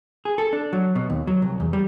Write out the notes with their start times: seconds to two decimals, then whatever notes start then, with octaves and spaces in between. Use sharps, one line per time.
0.25 G#4
0.38 A4
0.53 D4
0.73 F#3
0.95 B2
1.10 D#2
1.27 F#3
1.42 C2
1.60 E2
1.73 G3